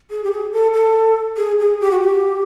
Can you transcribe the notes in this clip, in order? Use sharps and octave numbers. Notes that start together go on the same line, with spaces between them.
G#4
G4
G#4
A4
A4
G#4
G#4
G4
F#4
G4